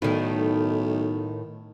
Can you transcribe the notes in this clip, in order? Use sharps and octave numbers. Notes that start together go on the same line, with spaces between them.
B1 A2 D#3